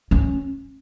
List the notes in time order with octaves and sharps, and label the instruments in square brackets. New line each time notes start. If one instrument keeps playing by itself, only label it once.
[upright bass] C#4